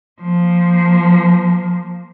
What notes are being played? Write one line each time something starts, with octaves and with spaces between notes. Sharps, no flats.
F3 A#3